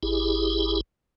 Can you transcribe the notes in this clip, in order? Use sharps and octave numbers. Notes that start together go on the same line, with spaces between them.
G#1 E4 G4 G#4